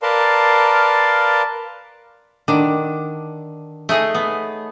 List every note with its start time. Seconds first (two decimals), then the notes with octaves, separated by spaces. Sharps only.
0.02 A#4 B4 D5 F5 A5 C6
2.48 D3 D#3 D4
3.89 A3 D#4 G#4 C#5 D#5
4.15 B3